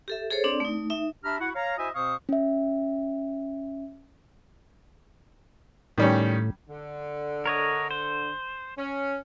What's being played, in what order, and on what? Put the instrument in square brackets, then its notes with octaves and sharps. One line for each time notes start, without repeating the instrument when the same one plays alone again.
[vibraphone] G4 A4 E5
G#4 A4 C5 C#5
C4 D4 D5
A3 D#4
D#4 E5
[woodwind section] D4 G4 E5 A#5 B5 F6
E4 F#4 F#5
C#5 F5 A#5
E4 F#4 C5 D#5 E5 G#5
B2 C4 C5 F5 C#6 D#6
[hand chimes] C#4 E5
[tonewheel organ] A2 [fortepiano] D#3 G3 C#4
[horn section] D3
[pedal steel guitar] A#4 C#5 D#5
C5
[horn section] C#4